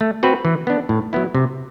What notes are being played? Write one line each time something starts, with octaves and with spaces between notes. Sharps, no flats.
A3
C4 F#4 B4
E3
B3 D4
A2
F#3 B3 E4
C3